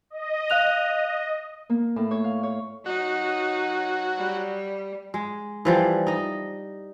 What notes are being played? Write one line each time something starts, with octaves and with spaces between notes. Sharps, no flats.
D#5
F5 F#6 F7
A#3
A2
C#5
F5
C#5
F#3 D#4 F#4
G3
G#3
E3 F3 G3
D#4 D#5